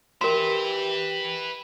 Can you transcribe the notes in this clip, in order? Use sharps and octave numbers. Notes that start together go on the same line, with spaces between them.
G4 A#4 B4 E5 C6